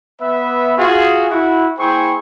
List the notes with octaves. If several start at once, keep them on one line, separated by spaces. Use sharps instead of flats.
B3 B4 E5
F4 F#4 G#4
E4 F#4
A#3 E4 G#4 C5 G5 C#6